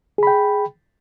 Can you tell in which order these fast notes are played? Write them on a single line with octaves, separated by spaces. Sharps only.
G#4 B5 G5